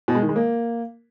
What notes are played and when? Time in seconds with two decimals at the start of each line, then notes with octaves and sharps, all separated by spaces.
0.08 B2
0.15 G#3
0.22 D#3
0.29 G#3
0.36 A#3